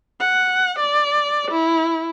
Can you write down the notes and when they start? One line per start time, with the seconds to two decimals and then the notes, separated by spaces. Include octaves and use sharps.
0.20 F#5
0.79 D5
1.51 E4